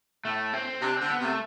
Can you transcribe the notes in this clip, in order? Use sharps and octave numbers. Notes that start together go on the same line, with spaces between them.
A2 A3
C4
C3 D4
D3 C4
B3
C3 A3